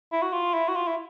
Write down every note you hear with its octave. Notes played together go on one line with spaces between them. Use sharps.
E4
F#4
F4
E4
F#4
F4
E4